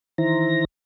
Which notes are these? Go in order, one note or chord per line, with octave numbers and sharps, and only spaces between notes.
D#3 E3 E4 C5 A#5 A#6